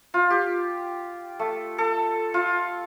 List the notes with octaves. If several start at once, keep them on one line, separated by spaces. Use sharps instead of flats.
F4
G4
A3
A4
F4